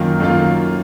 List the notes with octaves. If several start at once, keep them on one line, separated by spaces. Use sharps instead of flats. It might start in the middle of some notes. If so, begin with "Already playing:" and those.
Already playing: F#2 D#3 A#3 F4
F#2 D#3 A#3 F4